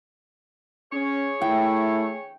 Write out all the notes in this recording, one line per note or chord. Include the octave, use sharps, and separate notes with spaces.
C#4 G#4 C#5
A3 E4 G5